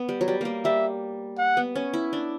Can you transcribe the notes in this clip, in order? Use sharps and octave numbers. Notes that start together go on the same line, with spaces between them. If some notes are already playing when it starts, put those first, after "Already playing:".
Already playing: B3
G3
F#3
G3
G3 A#3
G3 E5
F#5
B3
C#4
E4
D4